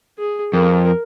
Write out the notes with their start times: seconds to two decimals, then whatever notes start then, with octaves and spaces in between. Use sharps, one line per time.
0.19 G#4
0.53 F2 A#4